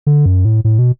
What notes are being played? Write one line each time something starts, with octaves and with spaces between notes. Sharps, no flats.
D3
F#2
A2
A2
B2